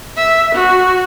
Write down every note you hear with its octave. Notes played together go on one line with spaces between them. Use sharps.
E5
F#4